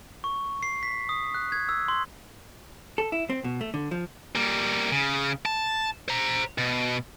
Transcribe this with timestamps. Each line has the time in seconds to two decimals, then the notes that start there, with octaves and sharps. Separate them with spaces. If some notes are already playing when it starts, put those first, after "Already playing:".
0.24 C#6
0.63 C7
0.83 B6
1.09 D#6
1.34 F#6
1.52 G#6
1.69 E6
1.88 C6
2.98 A4
3.12 E4
3.30 C4
3.44 B2
3.61 A3
3.74 D3
3.91 F3
4.35 G3 A#3
4.92 C#3
5.46 A5
6.08 C5 A#5
6.58 B2